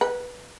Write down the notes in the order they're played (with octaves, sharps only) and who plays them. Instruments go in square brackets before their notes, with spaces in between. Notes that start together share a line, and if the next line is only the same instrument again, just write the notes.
[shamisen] B4